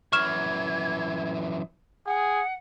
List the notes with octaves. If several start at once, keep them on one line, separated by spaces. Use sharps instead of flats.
F#2 E3 C#6 F6 G#6 E7
G#4 F#5